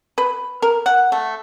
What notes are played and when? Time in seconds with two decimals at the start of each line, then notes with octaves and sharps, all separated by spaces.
0.18 B4
0.62 A#4
0.86 F#5
1.12 A3